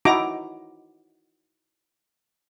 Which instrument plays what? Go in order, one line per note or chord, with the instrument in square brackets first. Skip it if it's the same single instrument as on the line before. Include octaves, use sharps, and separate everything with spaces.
[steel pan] D#4 E4 F#4 A#5 D6